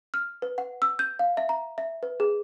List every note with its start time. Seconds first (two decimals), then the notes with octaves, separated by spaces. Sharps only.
0.14 F6
0.42 B4
0.58 F#5
0.82 E6
0.99 G6
1.19 F5
1.37 E5
1.49 A#5
1.78 E5
2.03 B4
2.20 G#4